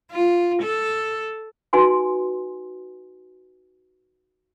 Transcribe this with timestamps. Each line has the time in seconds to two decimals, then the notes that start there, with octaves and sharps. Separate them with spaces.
0.12 F4
0.63 A4
1.73 D#4 F#4 B4 G#5 C6